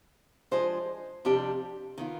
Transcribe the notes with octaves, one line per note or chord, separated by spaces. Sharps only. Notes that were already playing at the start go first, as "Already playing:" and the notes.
F3 G#3 D4 G#4 C5
F2 C3 G3 D4 G4
D#3 B3 F4